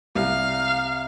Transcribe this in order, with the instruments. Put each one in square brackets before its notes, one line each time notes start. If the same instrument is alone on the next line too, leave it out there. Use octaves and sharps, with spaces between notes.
[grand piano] C2 [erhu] F5